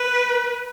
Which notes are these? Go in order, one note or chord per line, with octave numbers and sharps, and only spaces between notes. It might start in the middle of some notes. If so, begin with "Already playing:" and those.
Already playing: B4